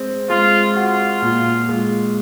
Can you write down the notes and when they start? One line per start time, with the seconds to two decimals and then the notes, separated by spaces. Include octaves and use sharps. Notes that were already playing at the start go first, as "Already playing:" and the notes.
Already playing: G#3 C4
0.30 G#3 F4
0.76 F4 F#4
1.22 A#2
1.69 G#3